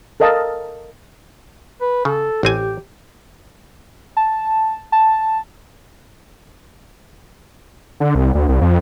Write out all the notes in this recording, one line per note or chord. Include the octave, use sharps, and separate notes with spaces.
A4 A#4 D#5 F5 A5
B4
C#3 A4
A1 C4 G4 G#5
A5
A5
D3
C2
D2
C2
F2